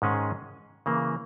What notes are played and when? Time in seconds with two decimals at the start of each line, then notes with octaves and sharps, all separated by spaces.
0.02 G#2 D#3 G#3 C#4 G#4
0.86 C#3 E3 A#3 C#4